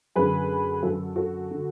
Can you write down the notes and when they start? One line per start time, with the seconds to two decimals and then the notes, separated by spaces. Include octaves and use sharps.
0.16 F#2 D3 G#4 B4
0.83 F#2 D3 F#4 A4
1.16 F#4 A4
1.51 D3